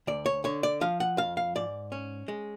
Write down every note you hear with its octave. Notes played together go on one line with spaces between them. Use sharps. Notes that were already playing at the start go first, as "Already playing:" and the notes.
D2 D5
C#5
D3 C#5
D5
F3 F5
F#5
F2 F5
F5
G#2 D5
C#4
G#3